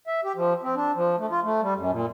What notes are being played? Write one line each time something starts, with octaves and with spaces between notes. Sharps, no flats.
E5
G4
F3
C4
D4
F3
A3
F4
A3
G3
F#2
A#2